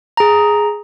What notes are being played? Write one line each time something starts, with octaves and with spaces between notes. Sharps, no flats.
G#4 A#5